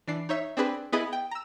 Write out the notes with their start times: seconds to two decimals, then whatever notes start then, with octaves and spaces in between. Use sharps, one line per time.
0.08 E3 D4 C7
0.29 D#4 C#5 E5
0.57 C4 D4 G#4 B4
0.92 B3 E4 G#4 D#5 B5 A6
1.13 G5
1.31 A#5 E6